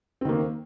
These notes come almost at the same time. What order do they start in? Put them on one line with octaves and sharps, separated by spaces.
C4 D#3 A#3